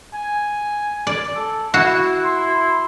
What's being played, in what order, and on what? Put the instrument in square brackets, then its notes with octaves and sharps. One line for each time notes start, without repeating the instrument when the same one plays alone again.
[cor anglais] G#5
[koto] D5
[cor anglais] A4
[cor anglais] E4 [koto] F#4
[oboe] C6